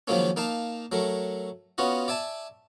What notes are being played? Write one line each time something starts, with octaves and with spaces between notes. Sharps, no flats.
D#3 F3 F#3 G#3 A#3 C#4
A#3 D#4 F5 A5
F#3 A3 A#4
B3 C#4 F4 F#4 D#5
D5 E5 G#5 A5